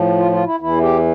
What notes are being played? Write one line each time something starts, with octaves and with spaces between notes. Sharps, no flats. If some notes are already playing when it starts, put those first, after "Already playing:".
Already playing: A2 F3
F4
F4
E4
E2 E3 E4
G4